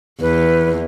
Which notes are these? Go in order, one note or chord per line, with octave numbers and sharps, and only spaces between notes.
E2 B4